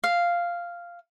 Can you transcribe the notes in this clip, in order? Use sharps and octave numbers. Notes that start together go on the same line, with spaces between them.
F5